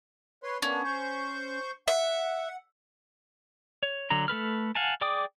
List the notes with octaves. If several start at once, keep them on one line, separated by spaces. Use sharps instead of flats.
B4 C#5 C6
A#3 B3 C#4 D4
C5 C#6 G6
E5 F#5
C#5
D3 F#3 A#5
A3 A4 B4 F6
F5 F#5 G#5 A5
G#4 D5 G5 D6 D#6